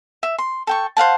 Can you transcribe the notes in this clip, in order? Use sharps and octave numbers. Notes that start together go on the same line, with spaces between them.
E5
C6
A4 G5 C#6
C5 F5 F#5 A5